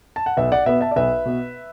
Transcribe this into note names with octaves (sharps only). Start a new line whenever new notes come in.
A5
F#5
B1 B4 E5
D5 F#5
B2 B3 B4 E5
E5 A5
D5
B1 B4 E5
B2 B3